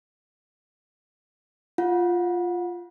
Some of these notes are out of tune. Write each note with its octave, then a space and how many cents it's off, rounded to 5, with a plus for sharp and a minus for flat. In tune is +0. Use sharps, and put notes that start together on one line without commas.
F4 +0 F#5 -30